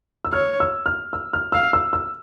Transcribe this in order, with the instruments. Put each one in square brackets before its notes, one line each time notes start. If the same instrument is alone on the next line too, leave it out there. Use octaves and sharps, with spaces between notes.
[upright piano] E6
[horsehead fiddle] C#5 [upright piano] F6
[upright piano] E6
F6
E6
F6
[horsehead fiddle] F5 [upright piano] E6
[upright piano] E6
E6